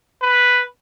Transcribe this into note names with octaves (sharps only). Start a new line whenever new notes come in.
B4